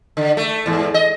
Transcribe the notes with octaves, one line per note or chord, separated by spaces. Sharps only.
D3
A3
E2 G#2
D#5